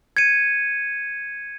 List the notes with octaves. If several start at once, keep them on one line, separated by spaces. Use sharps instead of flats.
G#6 C#7 D#7